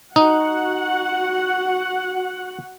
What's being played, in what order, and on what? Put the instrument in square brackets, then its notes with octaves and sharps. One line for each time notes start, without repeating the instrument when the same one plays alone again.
[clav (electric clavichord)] D#4 [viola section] F#4 F#5